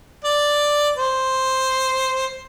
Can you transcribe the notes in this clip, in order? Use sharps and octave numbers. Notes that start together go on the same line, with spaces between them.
D5
C5